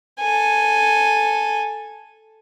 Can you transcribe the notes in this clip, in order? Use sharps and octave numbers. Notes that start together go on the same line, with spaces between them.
A4 G#5